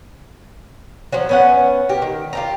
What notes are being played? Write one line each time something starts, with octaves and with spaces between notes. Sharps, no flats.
F3 F#3
B3 C#4 F#5
G4 A#4
D#3
F4 G4 A#5